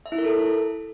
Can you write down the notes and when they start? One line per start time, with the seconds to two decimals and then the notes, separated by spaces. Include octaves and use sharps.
0.06 E5
0.12 E4
0.18 A#4
0.25 A4